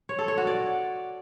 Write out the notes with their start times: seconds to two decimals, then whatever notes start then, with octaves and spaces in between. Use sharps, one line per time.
0.09 C#5
0.19 A4
0.28 C#5
0.38 F#4
0.47 D5